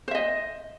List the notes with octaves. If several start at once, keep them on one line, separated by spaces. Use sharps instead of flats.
C5 D#5 E5